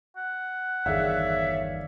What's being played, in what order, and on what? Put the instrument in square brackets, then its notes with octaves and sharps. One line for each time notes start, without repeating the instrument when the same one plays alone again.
[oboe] F#5
[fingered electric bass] G1 E2 D#3 [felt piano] G#4 F5 [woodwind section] C#5 D5 E5